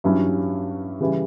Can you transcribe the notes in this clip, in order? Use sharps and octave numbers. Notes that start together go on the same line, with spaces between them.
G2 F#3 C#4 E4
C#3 E3 G3